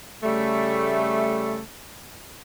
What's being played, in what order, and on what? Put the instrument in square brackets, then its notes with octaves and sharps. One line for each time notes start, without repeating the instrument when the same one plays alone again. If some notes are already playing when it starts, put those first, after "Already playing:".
[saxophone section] C#3 G3 A3